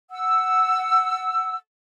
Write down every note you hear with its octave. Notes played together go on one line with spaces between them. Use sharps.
F#5 E6